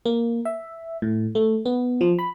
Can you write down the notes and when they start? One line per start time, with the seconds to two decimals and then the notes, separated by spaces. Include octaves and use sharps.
0.05 A#3
0.45 E5
1.02 A2
1.35 A3
1.66 B3
2.01 F3
2.19 B5